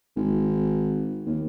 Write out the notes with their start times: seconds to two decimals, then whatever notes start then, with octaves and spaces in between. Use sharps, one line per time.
0.16 G#1
1.26 D#2